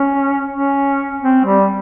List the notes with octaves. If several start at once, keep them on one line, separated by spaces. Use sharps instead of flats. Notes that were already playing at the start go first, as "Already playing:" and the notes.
Already playing: C#4
C#4
C4
G3